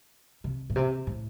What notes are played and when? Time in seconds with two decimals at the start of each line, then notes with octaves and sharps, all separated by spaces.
0.44 C3
0.70 A2
0.76 C3
1.07 A2